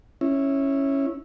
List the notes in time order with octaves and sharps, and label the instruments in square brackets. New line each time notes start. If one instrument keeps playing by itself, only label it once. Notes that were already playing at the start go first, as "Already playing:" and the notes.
[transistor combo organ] C#4 E4